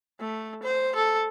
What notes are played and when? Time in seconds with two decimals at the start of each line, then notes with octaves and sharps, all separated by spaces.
0.20 A3
0.63 C5
0.95 A4